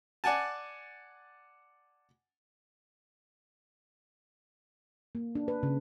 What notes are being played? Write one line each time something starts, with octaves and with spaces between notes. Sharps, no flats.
D5 F#5 G#5 A5
A#3
D4
B4
C#3